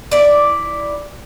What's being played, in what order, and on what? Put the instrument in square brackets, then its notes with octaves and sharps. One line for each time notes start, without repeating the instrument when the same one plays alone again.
[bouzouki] E4 D5